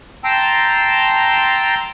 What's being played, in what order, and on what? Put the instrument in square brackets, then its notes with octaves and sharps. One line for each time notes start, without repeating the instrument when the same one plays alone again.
[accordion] G5 A5 A#5 C6 E6